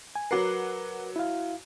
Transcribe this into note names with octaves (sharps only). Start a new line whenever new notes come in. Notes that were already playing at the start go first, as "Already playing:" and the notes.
G#5
F#3 A#4 B4 F#5 D6 C7
E4 F5